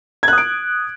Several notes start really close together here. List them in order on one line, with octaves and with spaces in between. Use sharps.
G#6 F#6 D#6 D7